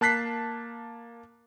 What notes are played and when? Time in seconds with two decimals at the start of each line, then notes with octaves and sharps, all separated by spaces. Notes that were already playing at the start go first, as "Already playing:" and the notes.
0.01 A#3 A5 F#6 B6 C7